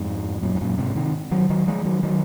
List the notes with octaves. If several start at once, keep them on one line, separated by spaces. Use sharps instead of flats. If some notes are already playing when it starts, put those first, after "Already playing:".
Already playing: F2 G#2
F#2 A#2
G#2
F#2 A#2
G#2 C3
C3 D#3
D#3 F#3
D#3 F#3
F3 G#3
D#3 F#3
D#3 F#3